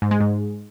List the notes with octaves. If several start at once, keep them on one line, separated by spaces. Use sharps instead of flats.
G#2
G#3
G#2